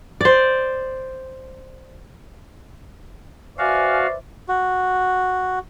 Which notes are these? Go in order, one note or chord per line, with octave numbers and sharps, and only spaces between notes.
C5 D5
F#4 B4 C5 D5 E5 F5 G#5 F6
F#4